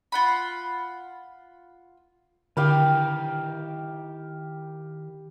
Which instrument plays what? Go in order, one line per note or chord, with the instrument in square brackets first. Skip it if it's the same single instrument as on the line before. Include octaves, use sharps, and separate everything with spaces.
[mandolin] F4 F#5 B5
[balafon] D3 [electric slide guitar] D#3 E4 A#4 [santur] G4 F5 G5